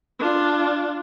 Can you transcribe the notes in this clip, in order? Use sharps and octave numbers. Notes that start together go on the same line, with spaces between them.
D4 F4